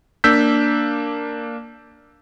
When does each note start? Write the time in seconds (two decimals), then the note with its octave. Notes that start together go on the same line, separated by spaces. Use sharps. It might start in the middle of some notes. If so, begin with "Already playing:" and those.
0.24 A#3 D4 E6 G6 B6